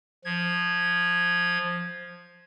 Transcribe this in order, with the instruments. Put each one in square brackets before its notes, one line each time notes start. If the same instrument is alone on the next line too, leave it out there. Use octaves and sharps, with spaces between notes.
[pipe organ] F3 G#6